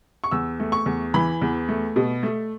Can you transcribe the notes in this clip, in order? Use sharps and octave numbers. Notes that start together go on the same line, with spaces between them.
C#6
E2 E6
A3
C#6
E2
E3 B5
E2
A3
B2
A3